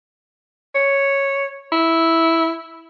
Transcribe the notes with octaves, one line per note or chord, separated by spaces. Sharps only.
C#5
E4